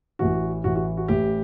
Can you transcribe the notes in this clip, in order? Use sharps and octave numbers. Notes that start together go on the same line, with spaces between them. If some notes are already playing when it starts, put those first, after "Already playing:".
A1 A2 E3 F#4
A1 A2 E3 F#4
F#4
F#4
A1 A2 E3 G4